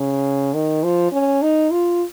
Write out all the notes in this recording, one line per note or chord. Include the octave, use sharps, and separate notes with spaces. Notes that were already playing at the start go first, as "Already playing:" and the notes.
Already playing: C#3
D#3
F3
C#4
D#4
F4